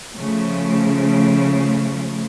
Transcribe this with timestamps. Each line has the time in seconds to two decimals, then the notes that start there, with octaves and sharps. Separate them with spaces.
0.15 C#3 F3 A3